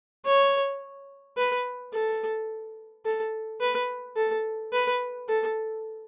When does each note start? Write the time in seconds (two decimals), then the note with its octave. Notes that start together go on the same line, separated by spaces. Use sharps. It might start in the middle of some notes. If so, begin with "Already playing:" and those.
0.26 C#5
1.37 B4
1.93 A4
3.05 A4
3.61 B4
4.17 A4
4.73 B4
5.29 A4